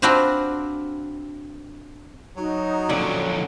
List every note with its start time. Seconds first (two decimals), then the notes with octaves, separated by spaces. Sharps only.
0.02 C4 D4 F4 F#4 B4 C5
2.38 F#3 D#4 F#4
2.90 F2 D3 C#4 D5